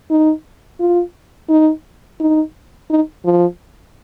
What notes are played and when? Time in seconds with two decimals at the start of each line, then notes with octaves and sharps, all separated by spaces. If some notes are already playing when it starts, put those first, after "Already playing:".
0.10 D#4
0.80 F4
1.49 D#4
2.20 D#4
2.90 D#4
3.25 F3